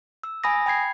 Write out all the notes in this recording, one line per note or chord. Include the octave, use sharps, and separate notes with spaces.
E6
G#5 B5 D#6 A#6
G5 B5 G#6 C7